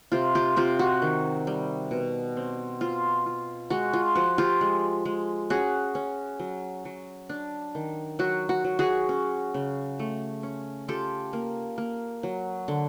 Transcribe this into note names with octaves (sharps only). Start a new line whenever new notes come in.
C3 F4 G4
F4 G4
C3 F4 G4
F#4
D#3
G3
B2
C4
C4 F4
F4
G#3 F#4
F4
F3 F#4
F4 G4
G#3
G#3
C#4 F#4 G#4
C#4
F#3
F#3
D4
D#3
F#3 F#4
F#4
F#3
F#4 G#4
C#4
C#3
A3
C#4
F4 G4 A4
A#3
A#3
F#3
D3